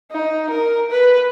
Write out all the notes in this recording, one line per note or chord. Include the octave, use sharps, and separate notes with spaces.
D#4
A#4
B4